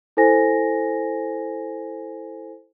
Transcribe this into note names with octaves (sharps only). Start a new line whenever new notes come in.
E4 A4 C5 G#5 A#6